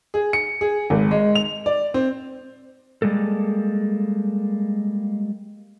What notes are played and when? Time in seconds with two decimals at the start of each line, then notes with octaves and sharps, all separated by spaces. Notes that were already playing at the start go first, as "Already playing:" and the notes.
0.14 G#4
0.33 C#7
0.61 G#4
0.90 G#1
1.11 G#3
1.35 F7
1.66 D5
1.94 C4
3.02 G3 G#3 A#3 A4